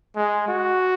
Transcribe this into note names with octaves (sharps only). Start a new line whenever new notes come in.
G#3
F#4